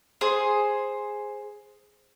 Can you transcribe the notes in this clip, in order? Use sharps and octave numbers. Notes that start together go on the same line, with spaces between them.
G#4 C5